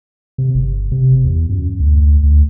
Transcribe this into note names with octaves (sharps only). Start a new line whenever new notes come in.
C3
G1
C3
E2
F#2
D2
D2